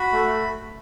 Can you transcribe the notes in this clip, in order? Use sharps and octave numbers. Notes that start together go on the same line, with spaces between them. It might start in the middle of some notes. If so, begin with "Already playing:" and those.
Already playing: F#4 B5
A3